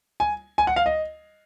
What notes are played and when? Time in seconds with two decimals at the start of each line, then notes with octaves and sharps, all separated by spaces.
0.20 G#5
0.58 G#5
0.67 F#5
0.76 F5
0.86 D#5